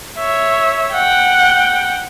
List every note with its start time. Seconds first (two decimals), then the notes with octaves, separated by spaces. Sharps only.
0.18 C#5 E5
0.96 F#5 G5